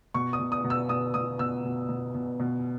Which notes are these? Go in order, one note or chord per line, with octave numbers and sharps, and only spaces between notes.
B2 C#6
D#6
B2
D#6
B2
E6
B2 D#6
B2 D#6
B2 E6
B2
B2
B2
B2